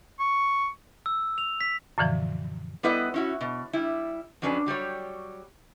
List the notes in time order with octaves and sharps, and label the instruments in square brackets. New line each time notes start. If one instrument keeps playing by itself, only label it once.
[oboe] C#6
[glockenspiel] E6
F7
B6
[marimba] F#2 A#2 D3 E3 F3
[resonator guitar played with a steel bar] G3 B3 E4 B4 D#5 F#5
C#4 E4 F#4
B2
G3 E4
F2 F#3 C#4 D4 B4
F#3 G3 G4 C#5